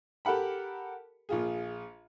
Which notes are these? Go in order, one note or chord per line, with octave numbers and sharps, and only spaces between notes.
G4 A4 A#4 F#5 B5
A#1 F4 G#4